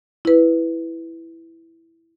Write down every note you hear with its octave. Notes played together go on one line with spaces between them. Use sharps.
E4 B4